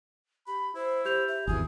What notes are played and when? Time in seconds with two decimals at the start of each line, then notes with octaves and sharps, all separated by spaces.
0.47 G4 B5
0.75 E4 C5
1.05 G4 C5 G6 F7
1.28 E5
1.47 G#1 E2 E3 F#4 G#4